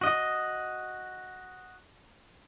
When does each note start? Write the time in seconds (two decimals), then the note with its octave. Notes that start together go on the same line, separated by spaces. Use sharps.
0.01 F#4 D#5